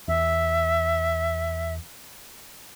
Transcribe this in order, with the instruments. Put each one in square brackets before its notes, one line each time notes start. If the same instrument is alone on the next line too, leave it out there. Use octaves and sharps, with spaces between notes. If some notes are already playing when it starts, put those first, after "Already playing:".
[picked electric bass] E2 [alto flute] E5